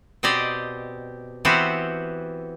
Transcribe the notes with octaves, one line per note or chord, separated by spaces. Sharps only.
B2 C4 G4 D5 D#5
E3 B3 C4 F#4 G4 C5